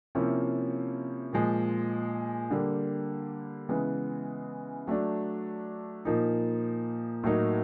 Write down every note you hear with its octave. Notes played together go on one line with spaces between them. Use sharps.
C3 F3 A#3 C#4 E4
A#2 F3 G#3
D3 G3 A#3
C#3 E3 G#3 B3
F#3 A3 D4
A#2 F3 A#3 D#4
A2 F#3 A#3 D#4